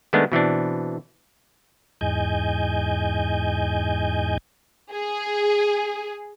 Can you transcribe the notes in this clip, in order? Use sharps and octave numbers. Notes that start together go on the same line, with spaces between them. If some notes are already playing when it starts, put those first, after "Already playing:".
D#3 G#3 A3 B3 D4
B2 E3 C4 D4
E2 G#2 D#5 G#5 G6
G#4